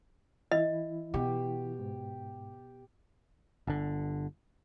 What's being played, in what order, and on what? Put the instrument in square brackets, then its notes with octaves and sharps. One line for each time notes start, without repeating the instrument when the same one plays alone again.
[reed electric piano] E3 E4 [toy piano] D#5
[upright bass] B2 [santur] G4
[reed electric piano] G#2
[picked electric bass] G1 D3